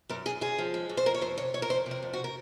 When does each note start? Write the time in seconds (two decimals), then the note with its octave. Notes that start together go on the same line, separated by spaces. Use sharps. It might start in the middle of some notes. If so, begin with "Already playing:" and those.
0.09 F#2 A#4
0.26 F#2 G#4
0.41 F#2 G#4
0.58 F3
0.74 G#3
0.89 F#2
0.97 C5
1.06 F2 A#4
1.14 C#5
1.21 F2 C5
1.38 C3 C#5
1.54 F2 C#5
1.62 A#4
1.70 F2 C5
1.86 C3
1.91 A#4
2.03 F2
2.13 F#4
2.24 A#4